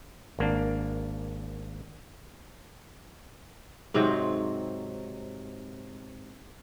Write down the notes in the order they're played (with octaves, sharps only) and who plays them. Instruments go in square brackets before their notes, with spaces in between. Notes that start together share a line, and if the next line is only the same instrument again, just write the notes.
[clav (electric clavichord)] G#1 A#3 D4
[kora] G#2 C3 F#3 C4